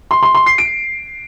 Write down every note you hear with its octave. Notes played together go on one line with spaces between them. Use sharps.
C6
C6
C6
C7
D7